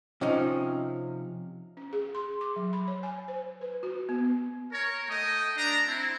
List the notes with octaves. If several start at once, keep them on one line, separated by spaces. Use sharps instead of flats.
C3 F3 C#4 D#4
C#4
G#4
C6
D6
F#3
B5
C#5
G#5
C5
B4
F#4
B3
A#4 C#5
A3 D#5 G5 D#6
D4 A#5
C4 E4